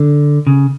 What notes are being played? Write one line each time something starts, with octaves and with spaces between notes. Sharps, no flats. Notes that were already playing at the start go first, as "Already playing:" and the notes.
Already playing: D3
C#3